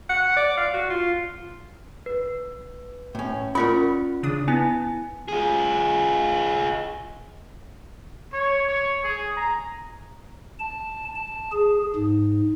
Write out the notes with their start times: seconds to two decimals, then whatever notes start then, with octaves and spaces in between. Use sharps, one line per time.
0.10 F#5
0.36 D5
0.57 F5
0.74 F#4
0.90 F4
2.06 B4
3.15 A2 C#4
3.55 C#4 F4 A#4 D5 B5 C#6
4.23 C#3 D4 D#6
4.48 B3 E4 G#5
5.28 F4 G#4
8.33 C#5
8.69 C#5
9.04 G#4
9.37 A#5
10.59 A5
11.15 A5
11.52 G#4
11.95 G#2